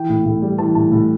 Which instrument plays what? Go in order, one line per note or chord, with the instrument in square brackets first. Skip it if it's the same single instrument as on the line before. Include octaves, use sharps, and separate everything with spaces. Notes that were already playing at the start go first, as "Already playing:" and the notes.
Already playing: [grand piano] E3 G5
A2
A2
G3
E3 A5
A2 A5
A2